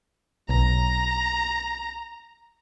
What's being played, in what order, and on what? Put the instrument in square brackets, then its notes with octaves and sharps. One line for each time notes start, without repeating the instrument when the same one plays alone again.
[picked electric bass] B1 [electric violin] A#5